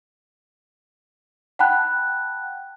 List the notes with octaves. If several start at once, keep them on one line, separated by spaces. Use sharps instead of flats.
F#5 G5 A5 B5 F#6